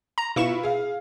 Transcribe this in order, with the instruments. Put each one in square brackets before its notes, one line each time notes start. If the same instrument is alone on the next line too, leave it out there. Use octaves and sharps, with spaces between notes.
[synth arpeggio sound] A#5
[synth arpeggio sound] B2 C#6 E7 [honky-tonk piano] E4 F4 B4
[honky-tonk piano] G#4 F5